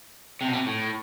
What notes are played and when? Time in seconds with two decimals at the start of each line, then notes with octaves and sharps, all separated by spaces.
0.41 C3
0.48 B2
0.53 C3
0.66 A2